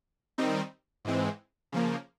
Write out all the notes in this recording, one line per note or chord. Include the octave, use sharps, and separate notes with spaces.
D#3 G3 C4 D#4
G#2 E3 G#3 C4
C#3 F3 A#3